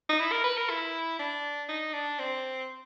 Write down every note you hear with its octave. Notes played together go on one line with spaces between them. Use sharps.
D#4
E4
A#4
B4
A#4
E4
D4
D#4
D4
C4